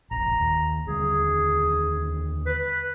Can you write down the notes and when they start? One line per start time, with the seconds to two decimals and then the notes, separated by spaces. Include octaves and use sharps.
0.11 E1 A#1 A#5
0.40 D#2
0.87 D#2 D3 G3 G#4
2.46 B4